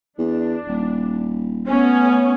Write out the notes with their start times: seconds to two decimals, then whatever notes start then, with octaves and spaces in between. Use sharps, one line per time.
0.19 E2 D4
0.68 D#1
1.67 A3 B3 C#4